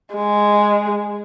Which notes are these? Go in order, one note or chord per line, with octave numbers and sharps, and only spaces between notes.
G#3